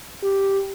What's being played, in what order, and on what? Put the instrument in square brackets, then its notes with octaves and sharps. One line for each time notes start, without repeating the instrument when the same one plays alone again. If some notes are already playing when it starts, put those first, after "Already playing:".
[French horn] G4